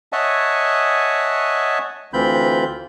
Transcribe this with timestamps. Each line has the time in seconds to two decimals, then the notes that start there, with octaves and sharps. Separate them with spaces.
0.12 C#5 D#5 E5 F#5 G#5 A5
2.13 D2 E3 C4 F4 B5 G6